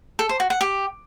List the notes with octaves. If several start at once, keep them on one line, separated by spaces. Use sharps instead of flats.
A4
C5
F#4
F#5
G4